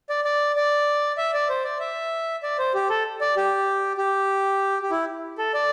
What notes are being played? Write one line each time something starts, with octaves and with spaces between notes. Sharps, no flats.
D5
D5
D5
E5
D5
C5
D5
E5
D5
C5
G4
A4
D5
G4
G4
G4
E4
A4
D5